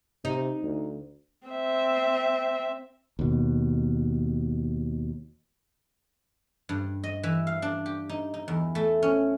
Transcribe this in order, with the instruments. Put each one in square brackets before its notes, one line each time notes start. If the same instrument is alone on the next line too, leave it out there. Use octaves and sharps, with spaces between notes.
[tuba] C3 [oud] D#4
[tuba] D2
[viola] C4 E5
[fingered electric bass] D#2 B2
[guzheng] G2
D#5
E3
F5
D4
G4
D#4
D#4
E2
A3
C#4